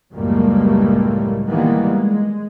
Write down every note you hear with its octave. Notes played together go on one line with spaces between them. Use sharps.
C#2 F#2 A2 G3 A3 A#3
D#3 E3 G3 G#3 A#3 B3
G#3